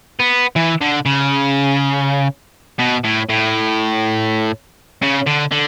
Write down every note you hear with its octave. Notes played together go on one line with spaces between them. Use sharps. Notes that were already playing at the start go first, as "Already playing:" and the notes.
B3
E3
D3
C#3
B2
A2
A2
C#3
D3
D3